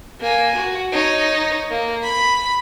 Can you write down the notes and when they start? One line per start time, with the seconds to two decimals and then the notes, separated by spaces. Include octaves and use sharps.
0.21 A#3 G#5
0.56 F#4
0.92 D#4 C#5
1.70 A#3
2.03 B5